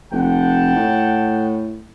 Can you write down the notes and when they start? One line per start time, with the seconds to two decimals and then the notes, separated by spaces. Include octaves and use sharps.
0.12 F1 F#5 G5 A5
0.75 A2